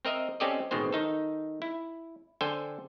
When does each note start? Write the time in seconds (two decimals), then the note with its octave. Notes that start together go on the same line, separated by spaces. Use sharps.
0.05 C4 A#4 D#5 E5
0.40 C4 C#4 G4 A4 D5 D#5
0.71 A1 B2 D#3 G#3 C4 C5
0.93 D#3 D#4 A4
1.62 E4
2.41 D3 A4 C5 G5 G#5